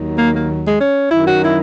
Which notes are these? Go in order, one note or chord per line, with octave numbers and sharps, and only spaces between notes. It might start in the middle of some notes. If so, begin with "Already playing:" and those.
Already playing: D#2 D#3 F#3
A#3
A#3
G#3
C#4
F#2 D#3 F#3 E4
F#4
E4